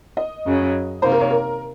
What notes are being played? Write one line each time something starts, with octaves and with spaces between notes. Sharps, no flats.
D#5
F#2 C#3 F#3 C#4
C3 D#3 A#3 C5
A#4
C#5
A#4